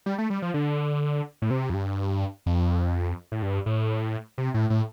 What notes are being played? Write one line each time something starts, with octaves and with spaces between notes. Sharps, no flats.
G3
A3
G3
F3
D3
A2
C3
F2
G2
F2
A2
G2
A2
C3
A2
A2